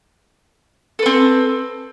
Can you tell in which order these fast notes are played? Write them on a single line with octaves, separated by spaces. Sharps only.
A4 B4 C4